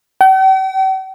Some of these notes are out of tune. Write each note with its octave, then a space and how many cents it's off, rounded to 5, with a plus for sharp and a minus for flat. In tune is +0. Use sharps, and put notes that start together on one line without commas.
G5 -45